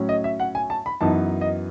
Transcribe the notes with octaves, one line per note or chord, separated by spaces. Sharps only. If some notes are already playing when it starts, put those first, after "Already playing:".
Already playing: A2 F#3 C#4
D#5
E5
F#5
G#5
A5
B5
F#2 E3 B3 D#4 A5
D#5